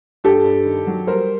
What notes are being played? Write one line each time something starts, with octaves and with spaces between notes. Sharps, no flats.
G2 G4 A4
G2
D#3
F#3
G3 A#4 C5